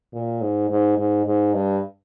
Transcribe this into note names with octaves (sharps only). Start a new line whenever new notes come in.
A#2
G#2
G#2
G#2
G#2
G2